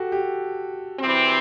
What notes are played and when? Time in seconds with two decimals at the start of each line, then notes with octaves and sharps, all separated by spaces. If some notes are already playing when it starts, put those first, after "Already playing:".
Already playing: F#4 G4 A4
0.12 G4
1.00 C3 E3 G3 C4